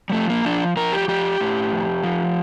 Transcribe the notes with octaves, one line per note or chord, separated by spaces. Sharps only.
G3
F3 A3
A#3
F3 D4
F3 A#4
G4
F3 G4
A2
F2
F3